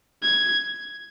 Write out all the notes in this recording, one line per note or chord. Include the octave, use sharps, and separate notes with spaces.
G#6